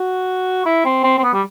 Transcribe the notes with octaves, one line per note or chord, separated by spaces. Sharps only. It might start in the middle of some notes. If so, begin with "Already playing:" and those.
Already playing: F#4
E4
C4
C4
C4
B3
G3